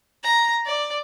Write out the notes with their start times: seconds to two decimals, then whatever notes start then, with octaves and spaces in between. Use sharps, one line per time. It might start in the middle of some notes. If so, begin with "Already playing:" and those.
0.23 A#5
0.65 D5